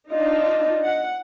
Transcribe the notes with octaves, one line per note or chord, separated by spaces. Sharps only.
D4 D#4 F4 D#5
F#5